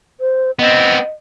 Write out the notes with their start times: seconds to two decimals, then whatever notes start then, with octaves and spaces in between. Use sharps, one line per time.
0.20 C5
0.59 B3 C4 D#5